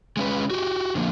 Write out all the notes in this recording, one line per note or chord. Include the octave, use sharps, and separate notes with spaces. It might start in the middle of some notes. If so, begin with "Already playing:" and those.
G#3 C#4 B4
F#4 G4
D3 F3 A#3